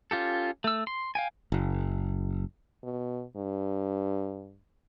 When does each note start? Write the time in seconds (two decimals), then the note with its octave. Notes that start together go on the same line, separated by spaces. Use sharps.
0.11 C#4 F4 G4 A4
0.64 A3 E6
0.87 C6
1.15 F5 G5 G#5
1.52 F#1
2.83 B2
3.36 G2